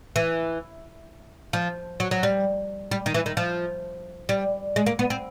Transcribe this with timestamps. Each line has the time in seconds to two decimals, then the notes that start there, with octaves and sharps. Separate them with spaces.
0.16 E3
1.53 F3
2.00 F#3
2.11 F#3
2.23 G3
2.91 G3
3.06 D#3
3.14 E3
3.26 D#3
3.37 F3
4.29 G3
4.76 G#3
4.86 A#3
4.99 B3
5.10 C4